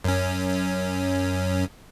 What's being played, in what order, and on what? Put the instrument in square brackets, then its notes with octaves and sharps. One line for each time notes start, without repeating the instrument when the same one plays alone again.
[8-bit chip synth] F#2 C#4